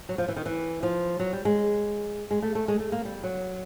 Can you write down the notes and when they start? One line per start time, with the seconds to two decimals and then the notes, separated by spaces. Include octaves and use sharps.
0.09 F#3
0.18 F3
0.28 E3
0.36 D#3
0.46 E3
0.83 F3
1.19 F#3
1.33 G3
1.45 G#3
2.31 G#3
2.42 A3
2.55 A3
2.68 G#3
2.80 A3
2.92 A#3
3.05 G3
3.24 F#3